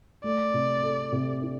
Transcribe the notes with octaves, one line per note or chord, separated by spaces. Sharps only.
A3 D5
C3
A4
C3
D4